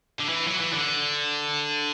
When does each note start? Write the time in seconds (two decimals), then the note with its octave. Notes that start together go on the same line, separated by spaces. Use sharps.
0.20 D3
0.29 E3
0.47 F#3
0.60 E3
0.73 D3